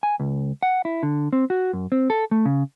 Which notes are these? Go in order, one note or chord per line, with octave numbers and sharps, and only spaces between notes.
G#5
C#2
F#5
E4
D3
C4
F#4
F#2
C4
A4
A3
C#3